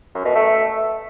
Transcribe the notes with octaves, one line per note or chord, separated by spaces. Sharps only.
F#2
B2
A3